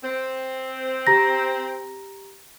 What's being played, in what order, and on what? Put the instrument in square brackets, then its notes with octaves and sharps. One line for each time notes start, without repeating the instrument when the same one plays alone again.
[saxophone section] C4
[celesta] G4 A#5 A#6